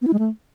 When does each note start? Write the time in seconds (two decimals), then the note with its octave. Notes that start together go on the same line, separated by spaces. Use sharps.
0.02 B3
0.07 E4
0.13 G#3
0.19 A3